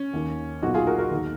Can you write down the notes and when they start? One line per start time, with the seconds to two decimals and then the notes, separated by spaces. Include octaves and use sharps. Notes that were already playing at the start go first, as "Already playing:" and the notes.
Already playing: C#4
0.13 D#2 D#3
0.62 B1 A#2 D#4 F#4
0.74 F4 G#4
0.87 F#4 A#4
0.99 F#4 A#4
1.11 D#2 D#3